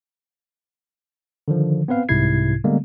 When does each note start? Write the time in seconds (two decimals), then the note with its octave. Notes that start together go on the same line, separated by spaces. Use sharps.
1.48 D3 D#3 F3
1.88 B3 C4 B4 F5
2.09 C2 G#2 C3 E4 G#6 C7
2.64 D3 G3 G#3 A#3 B3